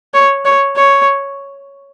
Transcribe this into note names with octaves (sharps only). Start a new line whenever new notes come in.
C#5
C#5
C#5